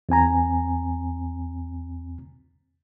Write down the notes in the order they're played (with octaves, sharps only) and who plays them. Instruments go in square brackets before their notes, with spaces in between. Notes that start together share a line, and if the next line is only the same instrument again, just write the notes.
[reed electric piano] E2 C4 G#5 A#5